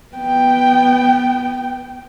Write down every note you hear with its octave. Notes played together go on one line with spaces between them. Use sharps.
B3 G5